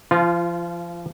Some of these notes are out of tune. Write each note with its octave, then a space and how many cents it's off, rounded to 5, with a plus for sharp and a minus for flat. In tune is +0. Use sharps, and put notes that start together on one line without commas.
F3 -30 F4 +0